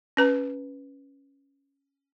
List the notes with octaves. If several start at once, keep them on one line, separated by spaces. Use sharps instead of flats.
C#4 B4 A#5